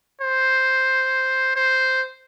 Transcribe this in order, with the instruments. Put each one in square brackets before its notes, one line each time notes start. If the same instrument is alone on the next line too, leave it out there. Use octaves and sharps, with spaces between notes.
[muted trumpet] C5
C5